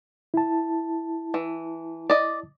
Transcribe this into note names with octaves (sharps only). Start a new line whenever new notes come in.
E4 A5
E3
D5 D#5